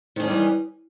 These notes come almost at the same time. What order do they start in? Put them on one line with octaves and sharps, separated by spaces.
D#3 G#4 C#4 G3 E3